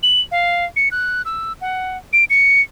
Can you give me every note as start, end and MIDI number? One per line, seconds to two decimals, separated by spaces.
0.03 0.21 102
0.31 0.65 77
0.76 0.89 97
0.91 1.22 90
1.25 1.53 88
1.61 1.97 78
2.13 2.24 98
2.30 2.61 97